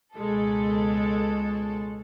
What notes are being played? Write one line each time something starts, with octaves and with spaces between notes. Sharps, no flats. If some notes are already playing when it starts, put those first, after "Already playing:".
C#2 B2 G#3 A4